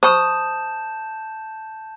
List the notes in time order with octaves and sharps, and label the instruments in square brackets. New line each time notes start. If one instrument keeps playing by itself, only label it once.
[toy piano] C5 B5 C#6 [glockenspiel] A5 G6 E7 [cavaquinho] D#6